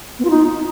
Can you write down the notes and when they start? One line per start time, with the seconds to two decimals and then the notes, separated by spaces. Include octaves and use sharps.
0.19 B3
0.25 F4
0.30 D#4